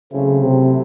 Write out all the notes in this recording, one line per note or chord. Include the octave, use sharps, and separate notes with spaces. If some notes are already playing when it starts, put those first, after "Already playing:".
C#3 F#3 A3 C4 E4
C3